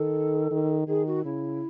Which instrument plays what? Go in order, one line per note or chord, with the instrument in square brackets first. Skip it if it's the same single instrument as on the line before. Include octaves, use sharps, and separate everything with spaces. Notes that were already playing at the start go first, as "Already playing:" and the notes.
Already playing: [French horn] D#3 [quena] A4
[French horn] D#3
[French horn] D#3 [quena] G#4
[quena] F#4
[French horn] C#3 [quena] E4